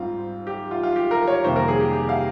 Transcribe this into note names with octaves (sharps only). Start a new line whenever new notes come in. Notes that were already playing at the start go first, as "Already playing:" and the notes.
Already playing: G#2 G3 C4 F4
G4
F4
F4
G4
A#4
C#5
F2 C3 D#3 G3 A#3 C5
A#4
G#4
G4
G4
F5